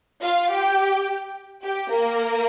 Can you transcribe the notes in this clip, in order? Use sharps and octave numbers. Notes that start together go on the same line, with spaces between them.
F4 F5
G4 G5
G4 G5
A#3 A#4